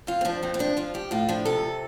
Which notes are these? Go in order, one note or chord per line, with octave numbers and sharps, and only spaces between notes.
F2 F4
C4
F3 D4
F2 C4
C4
F3 D4
F3 F4
F3 G4
A2 F4
F3 D4
C3 A4